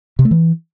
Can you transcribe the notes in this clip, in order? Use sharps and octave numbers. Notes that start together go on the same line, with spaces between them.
C3
A3
E3